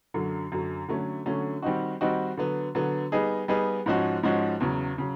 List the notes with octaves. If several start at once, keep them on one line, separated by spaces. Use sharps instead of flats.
F#2 D3 F#3
F#2 D3 F#3
D3 F#3 A3 C#4
D3 F#3 A3 C#4
D#3 G3 C4 D#4 F#4
D#3 G3 C4 D#4 F#4
D3 F#3 B3
D3 F#3 B3
G3 B3 D#4 G#4
G3 B3 D#4 G#4
G#2 F3 G#3 C#4 F#4
G#2 F3 G#3 C#4 F#4
E2 C#3 F#3
C#3 F#3